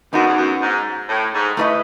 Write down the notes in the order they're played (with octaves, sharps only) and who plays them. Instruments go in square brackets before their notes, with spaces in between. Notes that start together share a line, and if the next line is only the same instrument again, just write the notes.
[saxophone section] F#2 [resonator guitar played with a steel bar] B3 D#4 F#4
[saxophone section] E2
F#2
G#2
A2
G#2
[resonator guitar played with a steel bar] A3 E4 B4 D#5